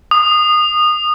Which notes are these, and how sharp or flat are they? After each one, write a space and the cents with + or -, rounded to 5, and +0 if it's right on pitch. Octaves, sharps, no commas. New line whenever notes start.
D#6 -25